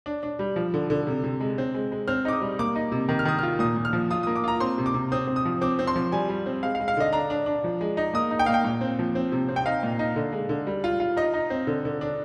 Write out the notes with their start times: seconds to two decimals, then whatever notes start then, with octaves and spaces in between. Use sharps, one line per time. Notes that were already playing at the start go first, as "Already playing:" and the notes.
0.06 D4
0.23 D4
0.39 G3
0.56 F3
0.74 D3
0.90 D3
1.07 C3
1.24 C3
1.40 G#3
1.58 C4
1.75 G#3
1.92 G#3
2.08 C4 F6
2.25 D#4 D6
2.33 D#6
2.41 G3
2.59 A#3 D6
2.75 D#4
2.92 C3
3.09 D#3
3.19 F6
3.25 D#3 D#6
3.39 F4 F6
3.59 A#2 D#6
3.76 A#2
3.85 F6
3.93 F3
4.11 F4 D#6
4.23 A#3 D#6
4.36 D6
4.44 F4 A#5
4.60 C4 C6
4.78 C3
4.86 D6
4.94 C3
5.12 C4 D#6
5.27 C4
5.36 D#6
5.45 F3
5.61 C4 D6
5.79 C4
5.87 C6
5.95 F3
6.12 G3 G#5
6.29 G3
6.46 C4
6.63 G#3 F5
6.75 F5
6.80 G#3
6.88 F5
6.97 D3 D#5
7.13 D4 A#5
7.30 D4
7.46 D4
7.64 F3
7.81 G#3
7.97 D#4
8.14 A#3 D#6
8.31 D#4
8.39 G5
8.46 A#3 F5
8.54 G5
8.64 A#2
8.81 C4
8.99 F3
9.15 C4
9.32 C3
9.48 C4
9.56 G5
9.66 D#4 F5
9.83 A#2
9.99 D#4
10.16 D3
10.33 G#3
10.49 D3
10.67 G3
10.84 F4
11.00 F4
11.17 D#4 D#5
11.34 D#4
11.50 C4
11.67 D3
11.85 D3
12.01 D4